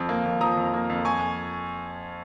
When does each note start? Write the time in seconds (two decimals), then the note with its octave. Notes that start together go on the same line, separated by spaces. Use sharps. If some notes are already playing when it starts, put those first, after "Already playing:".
Already playing: F2 F3 D#6
0.09 A#3
0.25 F2
0.41 F3 A#5 D#6
0.57 F2
0.74 A#3
0.90 F2
1.05 G#5 C#6